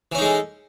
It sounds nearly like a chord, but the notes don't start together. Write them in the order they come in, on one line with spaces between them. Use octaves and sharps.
E3 C#4 D#4 G#3 A4